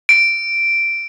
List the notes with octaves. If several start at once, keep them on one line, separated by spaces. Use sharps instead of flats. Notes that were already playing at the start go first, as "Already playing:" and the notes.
D7